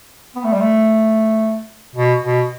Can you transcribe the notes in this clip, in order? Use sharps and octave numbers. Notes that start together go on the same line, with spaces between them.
B3
A3
G3
A3
B2
B2